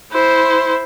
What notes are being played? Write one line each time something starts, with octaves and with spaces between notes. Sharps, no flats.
E4 C5